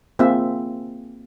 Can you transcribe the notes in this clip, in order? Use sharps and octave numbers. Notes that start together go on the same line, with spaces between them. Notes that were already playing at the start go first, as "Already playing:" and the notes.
A#3 C4 F4 G#4 E5